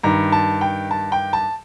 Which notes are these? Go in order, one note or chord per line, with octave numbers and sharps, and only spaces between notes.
G2 D#3 A#5
A5
G5
A5
G5
A5